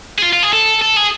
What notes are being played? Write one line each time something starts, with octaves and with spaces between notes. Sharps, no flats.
G#4
F4
F4
G#4
A4
A4
G#4